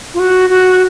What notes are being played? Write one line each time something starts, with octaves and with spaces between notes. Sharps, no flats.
F4
F#4
F#4